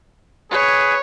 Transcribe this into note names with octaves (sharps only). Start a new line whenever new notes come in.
G#4 B4 C#5